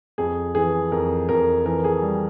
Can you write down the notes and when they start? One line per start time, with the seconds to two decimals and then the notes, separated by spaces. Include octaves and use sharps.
0.18 F2 G#4
0.55 E3 G#4
0.92 F2 A#4
1.29 F2 A#4
1.65 E3 A#4
1.84 G#4
2.02 G3